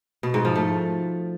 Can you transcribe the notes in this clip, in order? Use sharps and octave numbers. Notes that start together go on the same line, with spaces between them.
B2
G#2
F3
A3